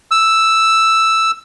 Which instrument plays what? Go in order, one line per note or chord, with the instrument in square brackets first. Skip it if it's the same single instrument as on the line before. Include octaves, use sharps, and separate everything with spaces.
[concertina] E6